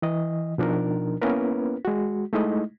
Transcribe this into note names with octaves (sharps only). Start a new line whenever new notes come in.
E3 D#5
B2 F3 D4 D#4 A#4
A#3 B3 C#4 E4 A#4 B4
G#3 F#4
G#3 A3 D#4 E4 D#5